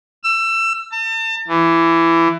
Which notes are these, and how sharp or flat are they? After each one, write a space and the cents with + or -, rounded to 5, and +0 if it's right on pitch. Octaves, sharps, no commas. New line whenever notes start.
E6 +25
A5 +35
E3 +15